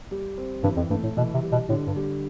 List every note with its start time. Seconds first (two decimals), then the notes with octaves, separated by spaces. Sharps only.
0.11 G3
0.38 C4
0.63 G2 E3
0.77 F2
0.90 G2 A3
1.03 A2
1.17 B2 E3
1.34 C3
1.42 G3
1.52 B2
1.69 A2 D3
1.87 G2
1.96 G3